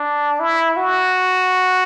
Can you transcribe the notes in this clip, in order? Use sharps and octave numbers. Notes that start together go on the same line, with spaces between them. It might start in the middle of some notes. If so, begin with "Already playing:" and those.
Already playing: D4
E4
F#4